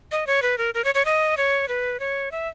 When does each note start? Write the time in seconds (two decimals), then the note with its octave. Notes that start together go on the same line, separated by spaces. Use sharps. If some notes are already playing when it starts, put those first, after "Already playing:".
0.12 D#5
0.27 C#5
0.42 B4
0.58 A#4
0.74 A#4
0.84 C#5
0.95 C#5
1.05 D#5
1.37 C#5
1.68 B4
2.00 C#5
2.31 E5